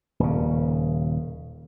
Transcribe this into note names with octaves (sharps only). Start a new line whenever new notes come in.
D#1 C#3